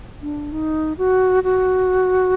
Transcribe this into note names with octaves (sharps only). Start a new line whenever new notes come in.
D4
D#4
F#4
F#4